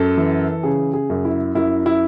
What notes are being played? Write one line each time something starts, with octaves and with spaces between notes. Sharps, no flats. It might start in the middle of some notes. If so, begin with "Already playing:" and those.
Already playing: F#2 A4
E3
C#3 G#4
G#4
F#2
E4
F#2 E4
E4